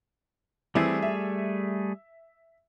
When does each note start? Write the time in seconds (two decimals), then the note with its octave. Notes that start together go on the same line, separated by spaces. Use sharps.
0.75 E3 G3 A3 C4 E4 G#4
1.02 E5